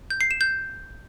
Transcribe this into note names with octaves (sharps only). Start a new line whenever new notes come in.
G6
C7
E7
G6